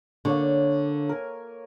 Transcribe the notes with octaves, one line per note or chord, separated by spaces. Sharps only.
D3 A#3 C#5 C#6
A#4 G#5